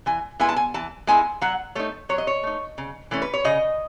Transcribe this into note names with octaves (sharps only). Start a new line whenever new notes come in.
E3 G#5
G#3 B3 E4 G#5
A5
G#5
E3 A5
G#3 B3 E4 G#5
F#3 F#5
A3 D#4 C#5
F#3 C#5
D#5
C#5
A3 D#4
C#3
E3 A3 C#4
B4
C#5
C#3 D#5